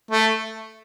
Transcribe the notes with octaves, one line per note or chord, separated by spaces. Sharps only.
A3